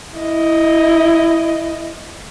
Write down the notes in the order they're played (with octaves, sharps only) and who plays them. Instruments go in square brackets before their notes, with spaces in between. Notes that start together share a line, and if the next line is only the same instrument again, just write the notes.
[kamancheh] E4 D#5